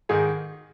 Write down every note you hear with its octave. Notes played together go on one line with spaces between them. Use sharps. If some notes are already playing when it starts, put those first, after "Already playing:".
G#2 D#3 G#4